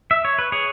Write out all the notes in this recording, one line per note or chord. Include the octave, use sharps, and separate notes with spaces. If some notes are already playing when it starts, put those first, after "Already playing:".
E5
C#5
B4
G#4 C#5